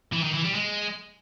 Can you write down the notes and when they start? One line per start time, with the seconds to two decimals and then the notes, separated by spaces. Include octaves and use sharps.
0.13 E3
0.24 D#3
0.34 E3
0.44 G3
0.55 G#3